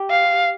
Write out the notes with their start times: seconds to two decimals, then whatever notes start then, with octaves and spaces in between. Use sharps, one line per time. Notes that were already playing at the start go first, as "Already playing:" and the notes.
Already playing: G4
0.10 F5